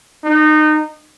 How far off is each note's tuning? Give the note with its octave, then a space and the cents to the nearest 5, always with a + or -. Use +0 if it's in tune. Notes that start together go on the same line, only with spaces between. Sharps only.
D#4 -25